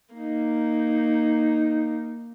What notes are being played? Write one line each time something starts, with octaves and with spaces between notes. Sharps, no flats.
A#3 D#4